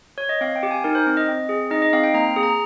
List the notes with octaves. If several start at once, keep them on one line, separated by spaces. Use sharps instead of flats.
C#5
D#5
C4 F5
G5
G4
G#5
D#4 A#4
C5
C4
D#5
C4
G#4
D#4 D#5
D#5
C4 F5
G5
A#3 A#5
G#4
A#5